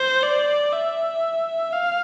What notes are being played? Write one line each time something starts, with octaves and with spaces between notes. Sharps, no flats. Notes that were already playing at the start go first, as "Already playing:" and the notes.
Already playing: C5
D5
E5
F5